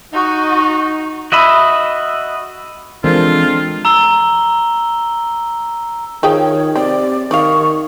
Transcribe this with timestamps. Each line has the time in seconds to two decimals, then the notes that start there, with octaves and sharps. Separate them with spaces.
0.13 D#4 F#4
1.32 F#4 D#5 E5 B5
3.04 E3 F3 G#3 C4 D4 F4 A4 A#4
3.85 A#5 E6 G7
6.23 D#3 F3 G#4 C#5 G5
6.76 C3 C4 D5
7.31 D#3 D5 F5 C#6